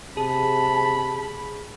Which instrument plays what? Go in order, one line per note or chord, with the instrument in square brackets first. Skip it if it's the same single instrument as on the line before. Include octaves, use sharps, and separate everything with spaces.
[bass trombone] C3 [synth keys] G#4 [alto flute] A5 [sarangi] B5